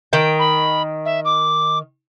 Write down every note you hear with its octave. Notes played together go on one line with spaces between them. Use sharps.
D#3 G5
B5
E5
D6